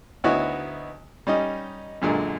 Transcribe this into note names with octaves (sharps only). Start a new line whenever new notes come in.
D2 B3 D#4 E4 F#4 C#5
G3 C#4 D#4 D#5
F#2 A#2 D3 G#3